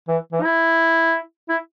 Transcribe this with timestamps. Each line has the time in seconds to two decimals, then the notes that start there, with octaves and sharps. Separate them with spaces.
0.09 E3
0.32 E3
0.43 E4
1.49 E4